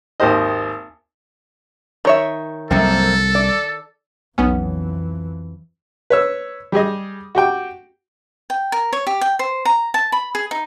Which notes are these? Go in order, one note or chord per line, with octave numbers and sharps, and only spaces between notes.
G#1 D#2 A#3 G4 C5 D#5
D#3 C#5 E5
C2 F#2 A#3 C4 A4
D5
B1 F2 E3 B3 C#4
B4 C#5 E6
G3 G4 G#4 D#5
F#4 G4 G5
G5
A#4
C#5
G4
G5
C5
A#5
A5
B5
G#4
D#4